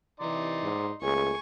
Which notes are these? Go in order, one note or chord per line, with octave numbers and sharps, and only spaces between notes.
C3 E3 D#4 D5 C6
G#2
C#2 A3 A#3 G#4 G#5 C#6